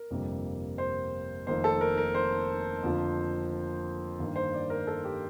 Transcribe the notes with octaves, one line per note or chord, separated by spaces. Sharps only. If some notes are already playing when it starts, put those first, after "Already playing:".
Already playing: A#4
G1 F2 C3 G3 A#3
C5
F1 F2 D#3 A#3 C5
A4
A#4
A#4
C5
F2 D3 F3 A#3
G2 D#3 A#3
C5
D5
A#4
A4
G4